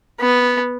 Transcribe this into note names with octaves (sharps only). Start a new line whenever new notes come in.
B3